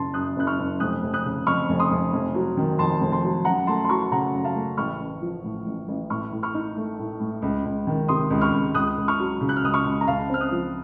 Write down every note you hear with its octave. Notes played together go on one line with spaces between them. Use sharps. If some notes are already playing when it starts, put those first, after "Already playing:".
Already playing: F#1 C#3 A5 C6
F#2 D#6 F#6
F#1 F#6
C#6 F6
F#1
F1 D#6 F#6
F1
D#6 F#6
C#3
F2 C#6 F6
F1
C6 D#6
F1
F1
F#3
D#3
F2 A5 C6
F1
A5 C6
F#3
F#2 F#5 A#5
A3 A5 C6
C6
F#3 A#5 C#6
C#3 F#5 A#5
F#2
F5 A5
A3
A1 C#6 F6
A1
F3
A2
A1
A1
A2 C#6 F6
A2
C#6 F6
D#4
A3
A2
A2
C#2
C#2
D#3
C3 C6 D#6
C#2
C#6 F6
C#2
C#2 D#6 F#6
C#2
C#6 F6
F#3
C#3
F#6
F6
C#2 D#6 F#6
C#6 F6
C#2
A#5
C#2 F5 A5
C4 F6
D#6 F#6
F3